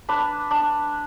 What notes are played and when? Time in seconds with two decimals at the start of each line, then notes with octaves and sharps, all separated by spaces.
0.09 D4 B4
0.51 D4